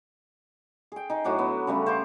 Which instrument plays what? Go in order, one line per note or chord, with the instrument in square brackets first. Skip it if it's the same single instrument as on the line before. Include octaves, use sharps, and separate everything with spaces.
[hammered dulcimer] G#4 G5
D#4 G#4
A2 F#3 D4 F#5
B3
C#3 G3 A3
C5 F5 C#6 D6